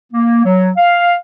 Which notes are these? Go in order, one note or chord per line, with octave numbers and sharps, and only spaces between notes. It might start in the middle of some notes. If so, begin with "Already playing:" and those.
A#3
F#3
F5